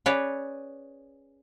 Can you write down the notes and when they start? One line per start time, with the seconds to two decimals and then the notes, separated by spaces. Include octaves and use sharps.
0.06 C#4 G#4 B4 C#5 D5